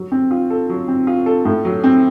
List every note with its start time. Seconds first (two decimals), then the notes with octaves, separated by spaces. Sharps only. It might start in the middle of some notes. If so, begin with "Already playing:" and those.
Already playing: F#3
0.12 C4
0.31 F4
0.50 A4
0.69 F#3
0.88 C4
1.07 F4
1.26 A4
1.45 A2
1.65 F#3
1.84 C4